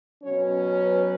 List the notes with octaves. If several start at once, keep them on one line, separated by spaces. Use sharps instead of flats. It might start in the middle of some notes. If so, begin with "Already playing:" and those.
B2 F#3 C#4 C#5
B4